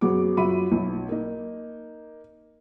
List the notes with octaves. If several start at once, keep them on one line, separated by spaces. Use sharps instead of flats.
F#2 F#3 B3 F#4 G#4 D6
F#2 F4 F#4 E5 B5 D#7
B1
A#3 D#4